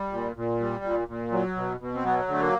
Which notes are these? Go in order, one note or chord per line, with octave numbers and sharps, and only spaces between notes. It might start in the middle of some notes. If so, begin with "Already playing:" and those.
Already playing: G3
A#2
A#2
G3
A#2
A#2
F#3
B2
B2
C4
F#3 B3
D3 A3
A#3